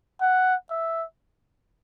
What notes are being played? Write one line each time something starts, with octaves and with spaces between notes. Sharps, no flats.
F#5
E5